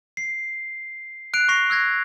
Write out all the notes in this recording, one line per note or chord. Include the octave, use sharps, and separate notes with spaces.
C7
F#6 C7 D7 F7
C#6 F#6 A#6 C7 F7
E6 F#6 G#6 A#6